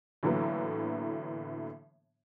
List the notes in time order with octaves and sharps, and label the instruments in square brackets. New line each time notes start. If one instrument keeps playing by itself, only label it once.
[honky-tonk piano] A2 D3 E3 F#3 A#3 B3